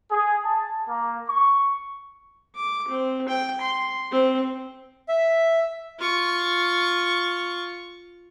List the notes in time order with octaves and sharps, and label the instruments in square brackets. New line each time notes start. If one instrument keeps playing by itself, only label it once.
[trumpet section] G#4
A5
A#3
C#6
[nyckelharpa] D6
C4
G5
C6
C4
[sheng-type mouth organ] E5
[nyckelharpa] F4 C#6